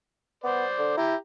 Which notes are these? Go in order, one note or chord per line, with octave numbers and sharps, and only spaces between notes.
B3 C5 D5
D3
E4 G4 A#5